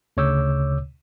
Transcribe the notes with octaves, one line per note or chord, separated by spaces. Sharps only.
D2 C#3 C#5 D6 E6 G6